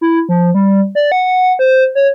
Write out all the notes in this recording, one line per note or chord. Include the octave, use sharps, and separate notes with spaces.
E4
F3
G3
D5
F#5
C5
C#5